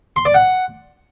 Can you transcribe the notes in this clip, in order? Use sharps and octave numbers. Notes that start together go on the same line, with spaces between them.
C6
D5
F#5